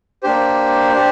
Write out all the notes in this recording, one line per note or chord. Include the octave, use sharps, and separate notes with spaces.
A#3 D4 G4 C5
D4 G4